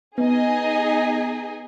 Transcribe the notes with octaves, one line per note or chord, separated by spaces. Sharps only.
B3 D#4 G#4 D#5 G#5